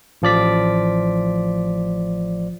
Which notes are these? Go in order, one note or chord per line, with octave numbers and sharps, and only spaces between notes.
A1 F3 D5 B6